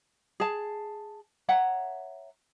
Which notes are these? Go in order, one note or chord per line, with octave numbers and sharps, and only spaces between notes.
G#4 A5
C#5 E5 F#5 A#5